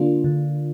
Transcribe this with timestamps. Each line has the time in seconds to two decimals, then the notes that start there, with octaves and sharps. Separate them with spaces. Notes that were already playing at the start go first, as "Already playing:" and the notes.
Already playing: D3 A#3 D4 F4
0.24 D3